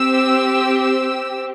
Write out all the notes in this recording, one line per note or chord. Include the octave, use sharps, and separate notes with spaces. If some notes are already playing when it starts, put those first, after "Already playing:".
Already playing: C4 G4 E6
E6